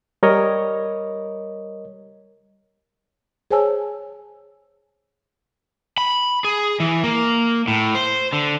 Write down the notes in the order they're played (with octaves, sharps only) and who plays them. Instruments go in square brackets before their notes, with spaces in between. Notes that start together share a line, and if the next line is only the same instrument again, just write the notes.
[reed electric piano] G3 A#4 C#5 D#5
[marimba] G#4 C5 C#5 G#5 A5 E6
[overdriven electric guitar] B5
G#4
E3
A#3
A2
C5
D3